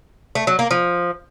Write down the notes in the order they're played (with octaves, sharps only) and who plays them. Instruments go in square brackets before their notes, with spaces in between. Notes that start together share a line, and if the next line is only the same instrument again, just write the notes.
[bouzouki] A3
F#3
A#3
F3